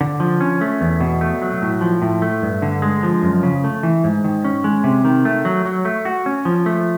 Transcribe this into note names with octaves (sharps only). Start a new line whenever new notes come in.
D3
F3
C#4
A3
E2
B2
A3
F#3
A2
F3
A2
A3
G2
D3
G#3
F3
F#2
C#3
A3
E3
G#2
D#3
C#4
G#3
C3
D#3
A3
F#3
F#3
A3
F#4
C#4
F3
A3